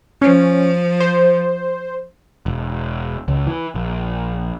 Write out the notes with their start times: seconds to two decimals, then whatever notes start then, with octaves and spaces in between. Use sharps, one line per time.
0.22 F3 C#4
1.00 C5
2.46 E1
3.28 C#2
3.47 E3
3.75 A#1